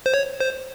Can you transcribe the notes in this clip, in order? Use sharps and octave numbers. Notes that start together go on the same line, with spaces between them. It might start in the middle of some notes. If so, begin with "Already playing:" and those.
C5
C#5
C5